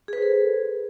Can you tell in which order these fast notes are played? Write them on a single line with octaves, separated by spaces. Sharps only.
G#4 B4 C5 A4